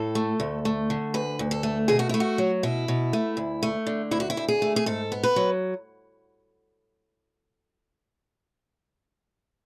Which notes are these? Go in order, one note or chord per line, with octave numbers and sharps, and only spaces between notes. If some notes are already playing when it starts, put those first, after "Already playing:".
Already playing: A2 A4
A3
D2
A3
D3
D2 B4
D2
A4
A3
B2 G#4
F#4
A3 E4
F#4
F#3
B2 E4
B2
A3
D2
A3
D3
D2 E4
F#4
E4
D2
G#4
A3
G#4
G#2 A4
B3
B4
F#3